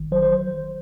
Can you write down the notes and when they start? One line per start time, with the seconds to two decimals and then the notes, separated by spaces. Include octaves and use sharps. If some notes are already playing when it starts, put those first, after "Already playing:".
Already playing: G1 D#3
0.12 F#3 C5
0.22 C5